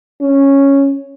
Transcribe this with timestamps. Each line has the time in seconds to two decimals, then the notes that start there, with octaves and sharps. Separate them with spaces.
0.21 C#4